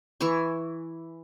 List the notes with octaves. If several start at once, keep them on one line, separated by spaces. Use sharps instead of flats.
E3 E5 G#5 C#6